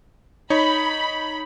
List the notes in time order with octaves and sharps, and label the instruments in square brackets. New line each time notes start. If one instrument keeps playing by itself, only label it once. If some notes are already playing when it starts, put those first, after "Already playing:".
[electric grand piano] D#4 C#5 [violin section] B5